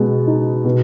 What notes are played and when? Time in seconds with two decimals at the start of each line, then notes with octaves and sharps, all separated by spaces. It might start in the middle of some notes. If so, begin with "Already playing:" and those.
Already playing: B2 G#3 B3
0.27 D#4
0.64 B2